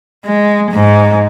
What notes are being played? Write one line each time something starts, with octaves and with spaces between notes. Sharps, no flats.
G#3
G#2